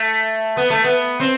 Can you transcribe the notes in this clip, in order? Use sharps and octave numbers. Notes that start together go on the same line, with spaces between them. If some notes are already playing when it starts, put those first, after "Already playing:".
Already playing: A3
B3
A3
B3
C4